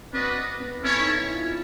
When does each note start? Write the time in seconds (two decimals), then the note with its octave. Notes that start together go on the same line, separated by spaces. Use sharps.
0.13 C4 D4 F#4 B4 D#5
0.60 B3
0.82 C4 C#4 E4 A4 C#5
1.00 D#4
1.16 E4
1.35 F4